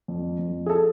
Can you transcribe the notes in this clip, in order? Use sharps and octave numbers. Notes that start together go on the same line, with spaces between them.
F2
F2
G#4
A4